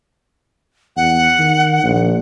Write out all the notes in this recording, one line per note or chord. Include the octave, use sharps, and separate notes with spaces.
E2 F#5
D#3
A#1